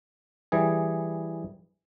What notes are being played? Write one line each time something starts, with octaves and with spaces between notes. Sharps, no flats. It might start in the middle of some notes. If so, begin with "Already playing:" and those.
E3 G3 G#4